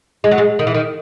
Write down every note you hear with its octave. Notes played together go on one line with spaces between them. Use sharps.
G#3
F#3
G#3
D#3
E3
D#3